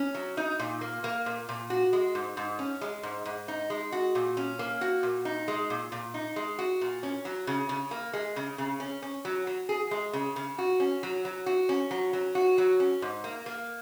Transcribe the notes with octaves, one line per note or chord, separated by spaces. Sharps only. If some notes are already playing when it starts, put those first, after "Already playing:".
Already playing: C#4
F#3
D#4
A#2
A#3
A#3
A#2
A#2
F#4
G#3
G#2
G#2
C#4
G#3
G#2
G#2
D#4
G#3
F#4
A#2
C#4
A#3
F#4
A#2
D#4
G#3
A#2
A#2
D#4
G#3
F#4
A#2
C#4
F#3
C#3
C#3
A#3
G#3
C#3
C#3
C#4
C#4
F#3
F#3
G#4
G#3
C#3
C#3
F#4
C#4
F#3
F#3
F#4
C#4
F#3
F#3
F#4
F#3
C#4
G#2
A#3
A#3